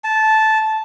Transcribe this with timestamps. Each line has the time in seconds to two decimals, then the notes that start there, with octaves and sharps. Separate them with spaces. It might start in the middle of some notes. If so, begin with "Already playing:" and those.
0.04 A5